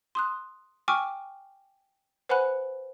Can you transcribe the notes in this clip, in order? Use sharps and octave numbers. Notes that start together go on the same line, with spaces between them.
C6 D#6 F#6
G5 G#5 C#6 D6 E6 F6
B4 C5 F#5 G#5 B5 F#6